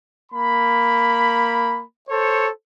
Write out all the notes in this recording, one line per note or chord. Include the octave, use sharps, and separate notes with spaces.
A#3 B5
A4 C5 C#5